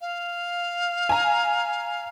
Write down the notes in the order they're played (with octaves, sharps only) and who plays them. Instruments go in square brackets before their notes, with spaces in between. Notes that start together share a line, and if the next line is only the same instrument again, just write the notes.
[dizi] F5
[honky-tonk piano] G#5 A#5